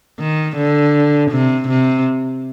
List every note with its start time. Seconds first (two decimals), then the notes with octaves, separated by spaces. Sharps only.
0.20 D#3
0.57 D3
1.31 C3
1.69 C3